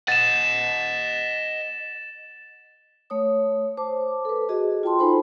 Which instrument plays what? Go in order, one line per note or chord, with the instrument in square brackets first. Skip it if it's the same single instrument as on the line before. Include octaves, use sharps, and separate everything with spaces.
[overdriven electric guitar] D#5 F#5 [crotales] A6 E7
[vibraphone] A3 C#5 D#6
C5 A5 D6
A4 B4
F#4 G#4 D#5
F4 G5 A5 C6
D#4 F4 A4 C5 G#5 B5